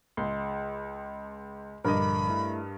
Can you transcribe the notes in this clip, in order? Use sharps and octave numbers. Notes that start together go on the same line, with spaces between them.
C#2 C6
A#1 G2 D3 A#4 D#5 B5 D6
A3 E4